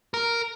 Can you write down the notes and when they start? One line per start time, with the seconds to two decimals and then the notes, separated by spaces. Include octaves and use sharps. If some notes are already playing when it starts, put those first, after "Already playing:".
0.14 A#4